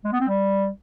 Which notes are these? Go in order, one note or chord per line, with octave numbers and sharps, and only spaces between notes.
G#3
B3
C4
G3